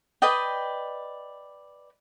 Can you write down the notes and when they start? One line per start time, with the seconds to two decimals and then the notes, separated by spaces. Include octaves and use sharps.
0.22 B4 D5 D#5 G5